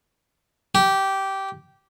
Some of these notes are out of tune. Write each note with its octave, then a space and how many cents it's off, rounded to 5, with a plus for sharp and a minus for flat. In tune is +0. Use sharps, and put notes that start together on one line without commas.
G4 -15